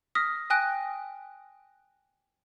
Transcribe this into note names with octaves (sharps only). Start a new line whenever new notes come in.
D#6 F6 A#6 B6
G5 G#5 D#6 F#6 A#6 D7